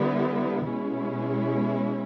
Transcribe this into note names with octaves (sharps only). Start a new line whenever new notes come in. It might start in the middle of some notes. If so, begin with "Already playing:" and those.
Already playing: D3 G3 B3 E4
B2 G#3 C#4 E4